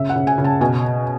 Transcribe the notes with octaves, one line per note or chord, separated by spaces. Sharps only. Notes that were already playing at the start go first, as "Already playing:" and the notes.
Already playing: C#3 E5
F#5
C#3
G#5
C#3
A5
B2 G#5